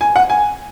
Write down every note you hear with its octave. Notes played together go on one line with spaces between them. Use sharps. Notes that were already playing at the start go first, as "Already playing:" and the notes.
G#5
F#5
G#5